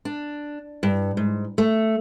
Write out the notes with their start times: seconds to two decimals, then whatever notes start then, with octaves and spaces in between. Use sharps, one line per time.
0.05 D4
0.83 G2
1.17 G#2
1.58 A3